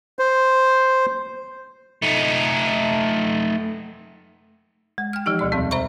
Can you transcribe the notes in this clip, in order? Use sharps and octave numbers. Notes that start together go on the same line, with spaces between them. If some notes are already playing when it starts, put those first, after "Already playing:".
C5
A3 D#4
G#3
G5 F6
E3 F3 D#4 G4
D2 B2 D5
E2 C3 G3 C4
C5 E5 A#5 B5 C#6